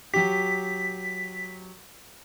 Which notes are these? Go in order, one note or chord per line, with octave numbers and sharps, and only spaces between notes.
F#3 G4 B6